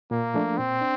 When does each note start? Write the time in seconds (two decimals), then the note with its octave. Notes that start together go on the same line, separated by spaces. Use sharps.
0.11 A#2 A#3
0.34 F3 A3 D4
0.58 A#2 C4
0.81 D4